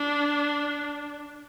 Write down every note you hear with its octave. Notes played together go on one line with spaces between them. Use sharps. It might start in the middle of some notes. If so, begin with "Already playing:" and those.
Already playing: D4